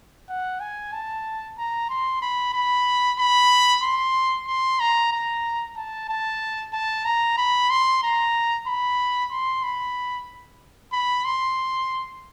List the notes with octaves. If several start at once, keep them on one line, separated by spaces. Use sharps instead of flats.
F#5
G#5
A5
A#5
C6
B5
B5
B5
C6
C6
A#5
A#5
A5
A5
A5
A#5
B5
C6
A#5
B5
C6
B5
B5
C6